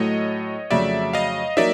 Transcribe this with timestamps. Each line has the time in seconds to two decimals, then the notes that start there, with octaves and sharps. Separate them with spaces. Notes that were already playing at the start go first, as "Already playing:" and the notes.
Already playing: A2 F#3 A3 C#5 D#5
0.71 F2 C#3 F#3 A3 D5 E5
1.13 D#5 F5
1.57 F#3 A#3 D#4 D5 E5